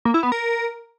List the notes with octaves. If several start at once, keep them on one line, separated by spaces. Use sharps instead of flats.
A#3
E4
B3
A#4